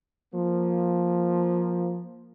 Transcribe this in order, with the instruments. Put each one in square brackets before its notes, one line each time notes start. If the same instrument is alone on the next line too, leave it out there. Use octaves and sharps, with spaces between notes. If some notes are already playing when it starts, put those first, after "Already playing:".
[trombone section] F3 A#3